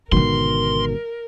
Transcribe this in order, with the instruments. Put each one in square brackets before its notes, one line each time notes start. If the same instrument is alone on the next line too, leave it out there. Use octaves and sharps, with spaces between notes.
[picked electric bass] G#1 B2 D#3 [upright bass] D3 G#3 [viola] A#4 [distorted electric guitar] C6